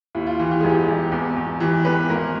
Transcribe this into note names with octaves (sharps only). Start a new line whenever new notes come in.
D#2 E4
F4
E3 G4
G4
E1 G#4
G4
E1
E2
E2
E3 G4
E2 B4
G#1 A#4